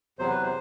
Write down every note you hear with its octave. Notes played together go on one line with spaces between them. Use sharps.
E2 C3 F#3 C5
B4
C5